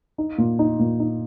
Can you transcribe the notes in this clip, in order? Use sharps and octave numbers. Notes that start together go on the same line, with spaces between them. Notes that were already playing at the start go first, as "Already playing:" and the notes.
D#4
A#2
D#4
A#2
D#4